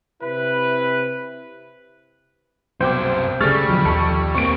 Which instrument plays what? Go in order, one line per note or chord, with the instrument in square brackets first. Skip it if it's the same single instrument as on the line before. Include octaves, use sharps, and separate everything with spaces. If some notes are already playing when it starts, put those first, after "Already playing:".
[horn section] C3 E4 B4
[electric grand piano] C2 B2 D6 [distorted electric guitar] F#2 G5 [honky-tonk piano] C5
[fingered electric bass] C#3 A3 [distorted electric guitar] G3 [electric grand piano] G#4 A4 [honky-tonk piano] C#6 F6 A6
[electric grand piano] B1 [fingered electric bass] D3 F3 F#3
[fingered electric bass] D#2 F3 [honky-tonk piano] A4 C#6
[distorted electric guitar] A#3 C4 [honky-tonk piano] C#6 D7